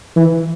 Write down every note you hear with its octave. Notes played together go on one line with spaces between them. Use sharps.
E3